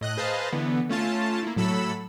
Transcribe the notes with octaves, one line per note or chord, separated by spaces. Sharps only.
A2 D#5 F#6
G#4 B4 C5 D#5 F5 A5
D3 E3 B3
A3 C#4 F4 A5
A#3 E4
A2 F#3 A4 B5 E6